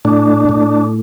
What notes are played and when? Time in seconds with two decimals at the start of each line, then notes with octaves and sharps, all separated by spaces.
0.05 A2 D4
0.49 A2